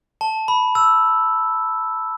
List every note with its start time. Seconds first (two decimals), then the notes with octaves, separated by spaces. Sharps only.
0.21 A5
0.48 B5
0.75 E6